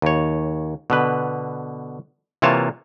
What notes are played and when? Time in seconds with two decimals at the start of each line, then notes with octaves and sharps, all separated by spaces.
0.02 D#2 C#5
0.90 B2 D3 B4
2.42 C3 E3 A#3 F4 C#5 A5